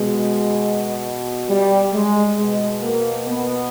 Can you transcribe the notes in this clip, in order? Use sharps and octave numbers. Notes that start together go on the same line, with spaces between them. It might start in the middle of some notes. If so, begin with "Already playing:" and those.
Already playing: B2 G#3
G3
G#3
B2 G#3
A#3
B3